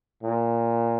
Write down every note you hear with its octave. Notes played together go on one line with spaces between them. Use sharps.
A#2